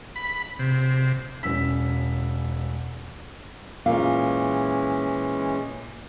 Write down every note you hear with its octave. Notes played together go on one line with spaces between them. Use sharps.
B5
C3
E1 C#4 E6 B6
A#2 E3 G#3 C#4 A#4 F5